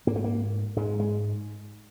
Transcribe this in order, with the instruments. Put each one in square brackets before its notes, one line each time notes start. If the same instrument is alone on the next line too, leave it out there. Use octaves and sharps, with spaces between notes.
[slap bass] G#2 A#3
A3
A#3
G#2 G#3
G#3